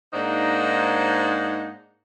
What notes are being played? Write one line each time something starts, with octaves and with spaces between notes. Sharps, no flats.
G#2 A#3 D4 D#4 C5 F#5